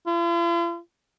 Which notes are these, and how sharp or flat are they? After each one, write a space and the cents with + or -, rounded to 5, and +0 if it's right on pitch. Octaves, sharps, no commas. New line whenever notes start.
F4 -45